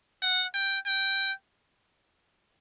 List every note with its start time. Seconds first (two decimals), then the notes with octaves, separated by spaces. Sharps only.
0.22 F#5
0.54 G5
0.87 G5